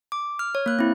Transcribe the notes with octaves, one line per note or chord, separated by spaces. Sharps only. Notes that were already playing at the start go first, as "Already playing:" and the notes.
D6
F6
C#5
A#3 F#6
C4 E4